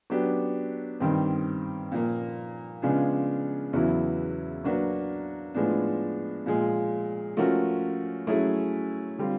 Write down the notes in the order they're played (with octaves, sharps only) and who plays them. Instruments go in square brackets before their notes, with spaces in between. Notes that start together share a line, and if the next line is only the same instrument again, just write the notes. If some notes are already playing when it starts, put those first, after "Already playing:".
[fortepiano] F#3 B3 D4 G4
G2 D#3 G3 C4
A#2 F3 A#3
C#3 F3 G#3 B3 D4
E2 C#3 F#3 B3 E4
F#3 A#3 D4 F#4 B4
A2 F3 G#3 B3 D4
A#2 F3 G#3
F3 A3 C#4 F#4 A#4
F#3 A3 C#4 E4 G#4
D3 G3 C4 F4